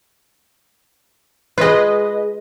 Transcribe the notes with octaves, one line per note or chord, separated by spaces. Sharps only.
G#3 F4 B4 D#5